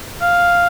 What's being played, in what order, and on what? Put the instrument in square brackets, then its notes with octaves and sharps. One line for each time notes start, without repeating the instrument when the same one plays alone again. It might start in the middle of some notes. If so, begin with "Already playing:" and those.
[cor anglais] F5